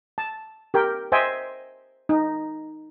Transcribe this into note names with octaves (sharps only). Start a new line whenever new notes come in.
A5
G4 A#4 G5
C5 D#5 E5 G5 G#5
D#4